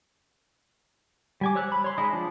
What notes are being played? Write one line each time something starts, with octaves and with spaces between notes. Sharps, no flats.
G3 G#5 D6
C5 C#5 E6 F#6
B5
C#5 C6
G#3 D#4 E4 B5 D#6
F3 D4